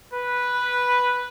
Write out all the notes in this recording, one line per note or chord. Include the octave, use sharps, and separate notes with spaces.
B4